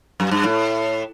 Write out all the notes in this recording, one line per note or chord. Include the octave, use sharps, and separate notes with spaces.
F#2
G2
A2